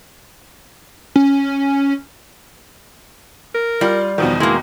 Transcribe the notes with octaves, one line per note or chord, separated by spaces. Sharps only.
C#4
A#4
G3 F4 D5
E2 B2 D#3 F3
G#3 A#3 E4